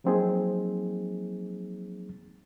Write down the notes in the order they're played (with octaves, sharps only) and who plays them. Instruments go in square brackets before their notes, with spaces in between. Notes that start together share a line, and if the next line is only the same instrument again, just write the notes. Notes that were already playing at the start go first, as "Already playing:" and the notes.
[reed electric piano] F3 F#3 A#3 C4 D#4 G#4